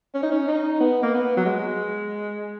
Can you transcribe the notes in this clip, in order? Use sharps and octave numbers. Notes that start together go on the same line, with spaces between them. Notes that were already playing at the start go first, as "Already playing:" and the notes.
C#4
D#4
C#4
D#4
B3
A#3
B3
F#3
G#3